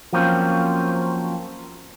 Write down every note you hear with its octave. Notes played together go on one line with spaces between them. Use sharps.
F3 F#3 A#3 C4 C#4